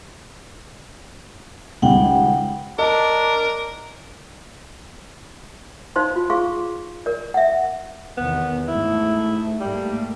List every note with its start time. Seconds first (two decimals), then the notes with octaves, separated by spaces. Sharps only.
1.82 C#2 D#3 G3 F#5 G5
2.79 D4 A#4 D#5
5.96 D#4 C5 F5 C6
6.16 F4
6.30 G#4 F5 C6 C#6
7.06 A#4 D5
7.34 E5 F#5
8.17 E2 C3 D#3 B3
8.68 G#2 A3 E4
9.60 G#2 G3 A3 A#3